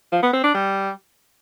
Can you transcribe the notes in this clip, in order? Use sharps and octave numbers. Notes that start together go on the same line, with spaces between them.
F3
B3
C4
D4
G3